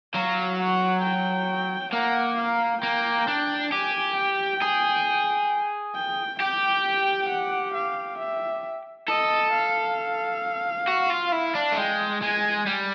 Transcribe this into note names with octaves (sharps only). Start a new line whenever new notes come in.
F#3 F5
F#5
G5
A#3 F#5
F5
A#3 G5
D4
G4 G#5
G5
G#4
G5
G4 G5
F#5
F5
E5
A4 D#5
F5
F#4
F4
E4
D4
A3
G#3 G5
G#3 G#5
G3